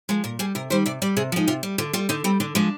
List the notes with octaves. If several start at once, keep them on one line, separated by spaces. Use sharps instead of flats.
F3 G#3 A#4
A#2 A#4
G3 G#4
C3 A#4
D#3 G3 C5
C3 D5
G3 D5
C3 G#4
F3 G#3 D#4
C3 F4
G3
D3 F4
G3 F4
D3 D#4
G3 C4
D3 D4
F3 G#3 D4